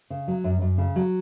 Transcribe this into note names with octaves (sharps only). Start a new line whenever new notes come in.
C#3
F#3
F#2
F#2
C#3
F#3